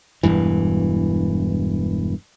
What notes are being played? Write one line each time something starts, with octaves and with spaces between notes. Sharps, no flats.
E1 C2 G2 E3